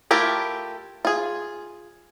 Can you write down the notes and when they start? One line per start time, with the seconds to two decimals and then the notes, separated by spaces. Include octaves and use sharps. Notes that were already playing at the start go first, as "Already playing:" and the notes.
0.11 A3 E4 F4 G4 A#4
1.05 F4 G#4